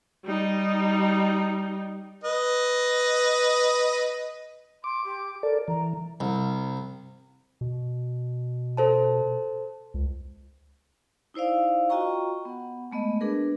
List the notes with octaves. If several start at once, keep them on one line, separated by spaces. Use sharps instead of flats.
G3 D#4
B4 D#5
C6 D6
G4
A4 A#4 D5
E3 A#5
C2
B2
A4 C5 A5
C#2
D#4 E4 C5 D5 F5
F4 F#4 D#5 G5 A#5 C#6
B3 F#5
G#3 A3 B3 D#5
D4 G#4 A#4 B4